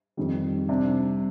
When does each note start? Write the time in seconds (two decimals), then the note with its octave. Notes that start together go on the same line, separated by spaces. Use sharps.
0.17 F2 D#3 G3
0.69 C3 G3 D4